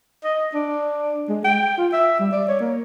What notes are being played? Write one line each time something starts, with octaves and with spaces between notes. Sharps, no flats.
D#5
D4
G#3
G5
F4
E5
G3
D5
C#5
A#3